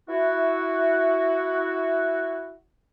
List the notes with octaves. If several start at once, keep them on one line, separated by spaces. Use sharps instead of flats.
E4 F#4